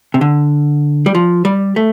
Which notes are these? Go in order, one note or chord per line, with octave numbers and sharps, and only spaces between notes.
C3
D3
G3
F3
G3
A3